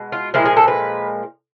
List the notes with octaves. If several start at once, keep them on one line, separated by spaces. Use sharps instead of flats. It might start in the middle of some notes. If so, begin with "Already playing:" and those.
Already playing: B2 G#3
F4
A#2 F3 G#3 E4
G#4
A4
B4